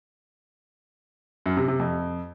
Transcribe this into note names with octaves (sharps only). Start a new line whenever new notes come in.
F#2
C3
C3
F2